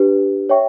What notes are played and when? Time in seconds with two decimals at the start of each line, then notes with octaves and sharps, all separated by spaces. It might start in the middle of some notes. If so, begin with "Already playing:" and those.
Already playing: D4 G4 B4
0.49 C#5 E5 G5 C#6